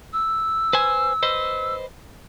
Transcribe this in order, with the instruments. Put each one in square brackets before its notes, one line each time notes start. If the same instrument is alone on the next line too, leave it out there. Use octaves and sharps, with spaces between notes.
[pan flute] E6
[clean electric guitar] B4 C5 G#5
B4 C5 D#5